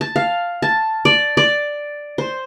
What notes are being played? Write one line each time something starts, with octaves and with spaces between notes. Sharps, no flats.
A5
F5
A5
D5
D5
C5